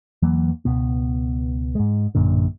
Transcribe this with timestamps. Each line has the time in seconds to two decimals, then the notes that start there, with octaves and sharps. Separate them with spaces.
0.22 E2 E3 F#3 A#3
0.65 C#2 B2 B3
1.75 G#2 G#3
2.15 A1 F#2 A#2 D3